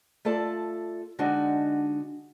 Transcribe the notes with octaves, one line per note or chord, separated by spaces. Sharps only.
A3 F4 A4 D5 A5
D3 G#3 D4 D#4 F#4